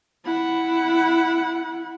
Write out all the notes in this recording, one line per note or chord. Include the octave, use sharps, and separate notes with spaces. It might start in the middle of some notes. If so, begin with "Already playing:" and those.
E4 F#5